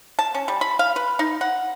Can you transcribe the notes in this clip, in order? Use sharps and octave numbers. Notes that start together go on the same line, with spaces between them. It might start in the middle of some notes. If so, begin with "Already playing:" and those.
A5
C#4
G3
B5
F5
B4
D#4
F#5